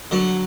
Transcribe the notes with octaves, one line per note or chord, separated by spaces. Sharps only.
D3 F#3